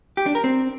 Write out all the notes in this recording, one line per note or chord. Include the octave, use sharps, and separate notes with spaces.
G4
D4
A#4
C4